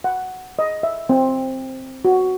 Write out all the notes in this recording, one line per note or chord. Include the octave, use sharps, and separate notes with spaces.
F#5
D#5
E5
C4
F#4